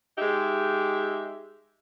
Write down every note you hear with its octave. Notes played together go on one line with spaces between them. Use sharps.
G#3 D#4 G4 E5